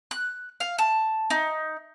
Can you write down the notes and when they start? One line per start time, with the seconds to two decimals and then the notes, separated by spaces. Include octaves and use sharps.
0.11 F#6
0.60 F5
0.78 A5
1.30 D#4